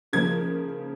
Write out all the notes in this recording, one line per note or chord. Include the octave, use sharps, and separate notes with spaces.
C#3 F3 A#3 G#6